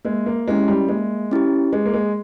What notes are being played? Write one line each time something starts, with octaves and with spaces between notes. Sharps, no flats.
G#3 A#3
A#3
G#3 C#4 E4 G4
G3
G#3 A#3
C#4 E4 G4
G#3 G#4
A#3
G#3